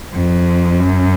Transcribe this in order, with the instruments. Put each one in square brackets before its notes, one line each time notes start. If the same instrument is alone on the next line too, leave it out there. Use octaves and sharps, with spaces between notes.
[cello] F2
F#2